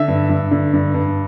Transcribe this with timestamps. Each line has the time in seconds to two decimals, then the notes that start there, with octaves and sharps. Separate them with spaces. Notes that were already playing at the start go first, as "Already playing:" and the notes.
Already playing: D3 E5
0.08 G2
0.29 G2
0.51 D3
0.73 G2
0.94 G2